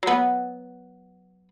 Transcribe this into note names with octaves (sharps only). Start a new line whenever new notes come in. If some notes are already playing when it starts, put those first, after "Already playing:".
F#3 B3